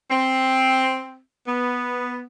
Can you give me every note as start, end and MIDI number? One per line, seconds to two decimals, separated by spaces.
0.11 1.15 60
1.46 2.22 59